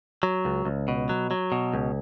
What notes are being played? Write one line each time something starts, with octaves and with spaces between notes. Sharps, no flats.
F#3
C#2
C#2
B2
F#3
F#3
B2
C#2